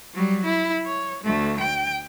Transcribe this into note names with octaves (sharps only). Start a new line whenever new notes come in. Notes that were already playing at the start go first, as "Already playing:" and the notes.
F#3 G3
E4
C#5
D2 A3
G5